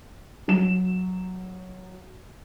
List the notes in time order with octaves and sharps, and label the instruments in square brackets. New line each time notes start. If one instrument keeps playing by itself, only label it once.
[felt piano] F#3 E7